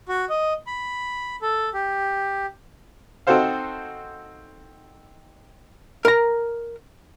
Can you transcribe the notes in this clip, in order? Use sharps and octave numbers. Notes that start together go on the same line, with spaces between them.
F#4
D#5
B5
A4
G4
C4 D#4 F#4 A4 C5 F5
A#4 A#5